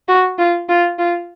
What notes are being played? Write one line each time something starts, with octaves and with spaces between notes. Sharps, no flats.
F#4
F4
F4
F4